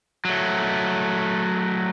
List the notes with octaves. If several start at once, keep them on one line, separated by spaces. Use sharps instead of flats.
F#3 A3